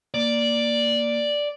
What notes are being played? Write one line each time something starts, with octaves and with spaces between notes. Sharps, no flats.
A#3 D5